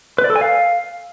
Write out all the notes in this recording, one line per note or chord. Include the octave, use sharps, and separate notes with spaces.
B4
D5
A4
G#5
F5